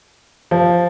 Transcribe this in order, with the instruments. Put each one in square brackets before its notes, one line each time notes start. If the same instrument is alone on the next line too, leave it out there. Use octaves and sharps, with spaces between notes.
[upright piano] F3